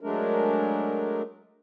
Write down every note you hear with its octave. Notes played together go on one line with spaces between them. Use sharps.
F#3 G#3 A3 D4 A#4